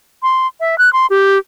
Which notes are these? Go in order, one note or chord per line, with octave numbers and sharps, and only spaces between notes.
C6
E5
F#6
C6
G4